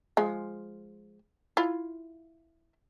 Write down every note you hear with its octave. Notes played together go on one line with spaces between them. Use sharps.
F3 G#3
E4 F4